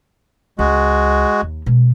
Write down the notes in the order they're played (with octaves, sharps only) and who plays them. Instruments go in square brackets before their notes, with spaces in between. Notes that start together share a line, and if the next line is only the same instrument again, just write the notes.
[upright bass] C#2 [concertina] G#3 F#4
[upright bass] D#2
B2 G#3